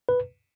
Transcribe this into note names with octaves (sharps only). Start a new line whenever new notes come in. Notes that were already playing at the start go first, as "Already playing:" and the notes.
B4